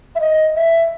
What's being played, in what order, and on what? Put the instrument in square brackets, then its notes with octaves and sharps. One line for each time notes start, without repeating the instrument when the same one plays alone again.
[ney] E5
D#5
E5